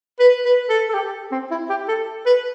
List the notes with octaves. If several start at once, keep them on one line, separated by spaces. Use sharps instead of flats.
B4
B4
A4
A4
G4
C4
E4
G4
A4
B4